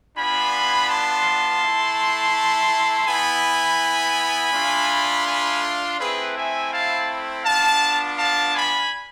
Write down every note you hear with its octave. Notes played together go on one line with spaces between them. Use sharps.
B3 D4 F4 G#5 B5
A5 C6
A3 E4
B3 E4 G#5 B5
A3 D4 F4
G#5 B5
A3 C4 E4 G#4 B4
E5 G#5
F5 A5
B3 D4 F4 F5 A5
F5 A5
G#5 B5